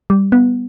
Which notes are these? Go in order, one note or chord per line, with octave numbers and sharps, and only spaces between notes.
G3
B3